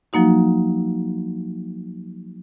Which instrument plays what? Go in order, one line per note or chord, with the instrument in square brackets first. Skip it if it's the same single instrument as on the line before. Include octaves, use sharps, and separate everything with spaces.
[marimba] F3 F#3 A#3 D#4 F#4